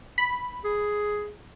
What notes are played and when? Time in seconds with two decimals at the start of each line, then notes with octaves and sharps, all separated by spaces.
0.18 B5
0.64 G#4